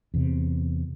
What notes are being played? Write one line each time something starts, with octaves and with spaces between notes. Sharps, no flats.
E2 C3